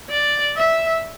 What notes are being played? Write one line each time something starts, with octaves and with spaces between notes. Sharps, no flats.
D5
E5